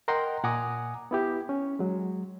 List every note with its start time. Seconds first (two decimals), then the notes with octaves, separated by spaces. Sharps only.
0.08 A#4 D#5 F#5 G5 A#5 C6
0.44 A#2 F#5 G#5 A#5 D6 D#6
1.11 B3 E4 G4
1.49 C#4
1.79 F#3 G#3